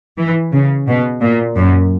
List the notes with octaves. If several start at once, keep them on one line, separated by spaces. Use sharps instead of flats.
E3
C#3
B2
A#2
F#2